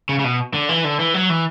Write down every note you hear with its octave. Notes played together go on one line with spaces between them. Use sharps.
C#3
C#3
B2
D3
E3
D3
E3
F#3
E3